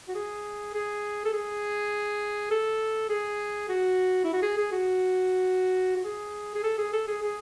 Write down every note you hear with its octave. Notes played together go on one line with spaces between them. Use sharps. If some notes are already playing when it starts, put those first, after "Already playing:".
F#4
G#4
G#4
A4
G#4
A4
G#4
F#4
E4
F#4
G#4
G#4
F#4
F#4
G#4
G#4
A4
G#4
A4
G#4
G#4